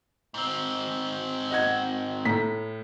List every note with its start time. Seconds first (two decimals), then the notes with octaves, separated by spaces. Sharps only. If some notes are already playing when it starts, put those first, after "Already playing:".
0.34 G#2 C4
1.51 D#5 F#5 G#6
2.25 A2 A#5 B6